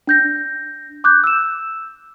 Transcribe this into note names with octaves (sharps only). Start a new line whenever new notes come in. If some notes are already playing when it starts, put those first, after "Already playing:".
D4 G6 A#6
D6 F#6 G6
E6 E7